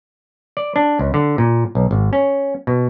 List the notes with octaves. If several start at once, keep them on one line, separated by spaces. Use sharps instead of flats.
D5
D4
C#2
D3
A#2
B1
G#1
C#4
B2